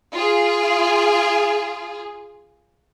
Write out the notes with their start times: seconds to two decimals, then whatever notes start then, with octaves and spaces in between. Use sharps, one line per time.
0.13 F4 G#4